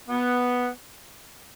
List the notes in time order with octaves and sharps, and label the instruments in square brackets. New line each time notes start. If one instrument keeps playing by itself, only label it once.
[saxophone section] B3